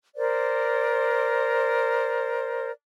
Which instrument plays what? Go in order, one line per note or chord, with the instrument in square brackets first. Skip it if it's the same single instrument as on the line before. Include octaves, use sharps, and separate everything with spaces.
[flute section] A#4 C5 D5